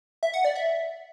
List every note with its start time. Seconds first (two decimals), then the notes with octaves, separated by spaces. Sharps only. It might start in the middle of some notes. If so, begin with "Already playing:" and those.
0.23 E5
0.34 F#5
0.45 D5
0.56 E5